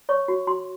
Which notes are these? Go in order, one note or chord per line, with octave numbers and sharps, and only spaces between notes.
C#5 C#6
F#4
F#4 C6